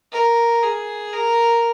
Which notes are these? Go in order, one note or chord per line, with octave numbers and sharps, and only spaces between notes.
A#4
G#4
A#4